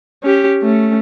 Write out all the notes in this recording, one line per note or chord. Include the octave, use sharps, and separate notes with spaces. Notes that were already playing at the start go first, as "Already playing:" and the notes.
C#4 G4
A3 C#4